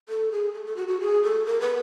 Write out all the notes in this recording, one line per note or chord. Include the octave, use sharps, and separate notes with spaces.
A4
G#4
A4
A4
F#4
F#4
G#4
A4
A#4
B4